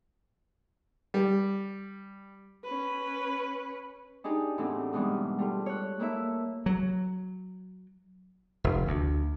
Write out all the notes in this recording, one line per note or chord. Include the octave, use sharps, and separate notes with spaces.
G3
C#4 B4
D4 D#4 G4 G#4
E2 A2 C4 D4
G#2 B2 E3 G3
G3 A3 F4
C#5 F#6
A3 A#3 E4 E5
F#3
F1
D2